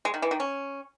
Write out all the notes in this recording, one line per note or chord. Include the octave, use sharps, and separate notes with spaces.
G#3
D#3
E3
D#3
C#4